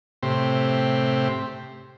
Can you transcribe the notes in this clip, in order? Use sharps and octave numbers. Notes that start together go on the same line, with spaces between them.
A2 C3 G4 C5